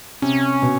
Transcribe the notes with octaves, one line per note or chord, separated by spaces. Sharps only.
C3 C#4
B2